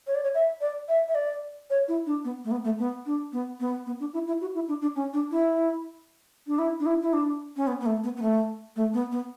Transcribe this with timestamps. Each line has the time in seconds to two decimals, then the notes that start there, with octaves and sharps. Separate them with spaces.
0.07 C#5
0.15 D5
0.23 C#5
0.34 E5
0.61 D5
0.88 E5
1.08 E5
1.15 D5
1.70 C#5
1.88 E4
2.06 D4
2.24 B3
2.44 A3
2.51 B3
2.64 A3
2.78 B3
3.06 D4
3.32 B3
3.60 B3
3.86 B3
4.00 D4
4.13 E4
4.27 E4
4.41 F#4
4.54 E4
4.68 D4
4.81 D4
4.95 C#4
5.13 D4
5.31 E4
6.47 D4
6.58 E4
6.79 D4
6.85 E4
7.02 E4
7.13 D4
7.56 C#4
7.67 B3
7.80 B3
7.86 A3
8.03 B3
8.16 B3
8.22 A3
8.76 A3
8.93 B3
9.11 B3